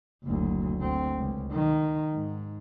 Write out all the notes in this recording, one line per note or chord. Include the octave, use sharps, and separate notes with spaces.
F#1 D2
D2 C4
C#2
D#3
G#2